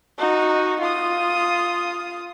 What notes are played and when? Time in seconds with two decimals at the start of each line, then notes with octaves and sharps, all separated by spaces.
0.19 D#4 F#4
0.80 F4 D#6